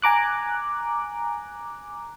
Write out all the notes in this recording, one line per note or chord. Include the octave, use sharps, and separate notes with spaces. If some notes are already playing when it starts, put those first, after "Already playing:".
G#5 A#5 D6 F#6